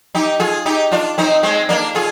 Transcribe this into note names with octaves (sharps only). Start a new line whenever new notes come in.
D#4 G4
F4 G#4
D#4 G4
D4 F4
C4 D#4
G#3 C4
A#3 D4
F4 G#4